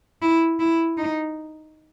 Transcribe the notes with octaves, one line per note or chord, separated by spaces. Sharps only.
E4
E4
D#4